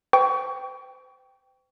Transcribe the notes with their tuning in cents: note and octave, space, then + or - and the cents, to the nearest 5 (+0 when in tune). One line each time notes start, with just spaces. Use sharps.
C5 -40 G5 +0 C#6 +30